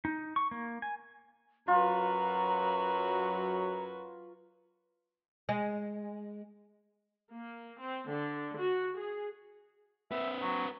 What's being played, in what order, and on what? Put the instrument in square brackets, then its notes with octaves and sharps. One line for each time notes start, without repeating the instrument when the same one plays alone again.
[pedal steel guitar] D#4
C#6
A#3
G#5
[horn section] F#2 F#3 [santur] F4 [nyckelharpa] F#4 B4 [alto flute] A#5
[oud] G#3
[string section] A#3
C4
D3
F#4
G#4
[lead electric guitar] C4 B4 [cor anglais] E5
[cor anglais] F#3